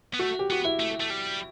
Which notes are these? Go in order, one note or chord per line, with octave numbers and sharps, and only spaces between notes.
B3
A3 F#4
G4
B3 F#4
E4
A3
A3
G3